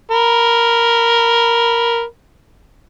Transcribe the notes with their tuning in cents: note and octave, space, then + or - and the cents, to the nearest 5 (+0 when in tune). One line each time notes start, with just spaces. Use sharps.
A#4 +0 B5 -10